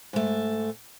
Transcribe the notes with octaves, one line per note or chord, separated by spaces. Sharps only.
G#2 A3